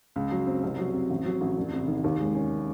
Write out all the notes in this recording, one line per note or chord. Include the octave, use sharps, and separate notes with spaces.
C#2
F#3
C4
C2
F#3
C4
A1
F#3
A1
E1
C3
D#3
D#2
G#3
C#4